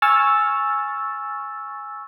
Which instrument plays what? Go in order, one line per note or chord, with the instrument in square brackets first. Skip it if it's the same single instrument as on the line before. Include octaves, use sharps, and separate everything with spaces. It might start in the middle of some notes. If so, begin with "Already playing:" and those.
[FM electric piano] G#5 C#6 E6 F6 A6